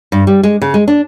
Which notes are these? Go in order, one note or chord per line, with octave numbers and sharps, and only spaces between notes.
G2
G3
G#3
C#3
G#3
D4